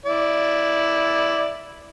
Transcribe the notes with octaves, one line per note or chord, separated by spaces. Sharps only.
E4 D5